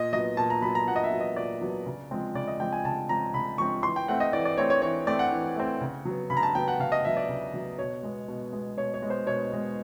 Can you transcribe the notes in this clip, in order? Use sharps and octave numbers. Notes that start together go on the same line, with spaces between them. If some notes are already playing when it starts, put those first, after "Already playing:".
Already playing: A#2 D#5
F#3 B3 D#5
A#2 A5
A#5
F#3 B3 B5
A#5
A#2 F#5
D#5
E5
F#3 B3
D#5
A#2 D5
F#3 B3
C#3
F3 G#3 C4
C#3 D5
D#5
F3 G#3 C4 G5
G#5
C#3 A5
F3 G#3 C4 A#5
C#3 B5
F3 G#3 C4 C#6
E3 C6
G5
A3 C4 F#5
D#5
E3 D5
D5
A3 C4 C#5
C#5
E3 C#5
A3 C4 D5
F#5
E3
A3 C4
C#3
F#3 B3
C#3 B5
A#5
A5
F#3 B3 G5
F#5
C#3 F5
D#5
F#3 B3 E5
D5
C#3
F#3 B3
B2 C#5
G#3 B3
B2
G#3 B3
B2 C#5
C#5
G#3 B3
C5
B2 C#5
G#3 B3